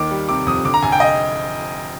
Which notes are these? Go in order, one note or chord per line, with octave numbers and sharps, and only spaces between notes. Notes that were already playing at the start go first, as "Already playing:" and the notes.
Already playing: D#2 D#3 D6
G3
C3 D6
F2 D#6
D3 D6
A#5
F1 G#5
G5
D#5